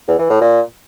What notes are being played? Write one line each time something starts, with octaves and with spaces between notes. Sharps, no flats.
E2
E3
A2
A#2